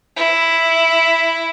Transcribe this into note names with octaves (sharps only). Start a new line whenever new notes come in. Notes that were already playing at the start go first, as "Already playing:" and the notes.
E4